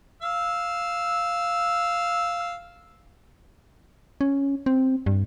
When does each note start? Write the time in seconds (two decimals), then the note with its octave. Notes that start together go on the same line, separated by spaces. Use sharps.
0.22 F5 E6
4.21 C#4
4.66 C4
5.06 G2